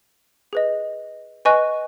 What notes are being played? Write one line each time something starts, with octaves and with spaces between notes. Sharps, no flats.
G#4 B4 D#5
B4 D#5 G#5 C#6 F#6